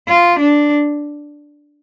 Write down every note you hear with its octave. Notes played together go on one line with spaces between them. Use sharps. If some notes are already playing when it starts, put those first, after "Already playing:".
F4
D4